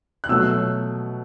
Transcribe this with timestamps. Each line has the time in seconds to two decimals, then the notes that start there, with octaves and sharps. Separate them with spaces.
0.24 F#6
0.29 B2 F#3 A3 E6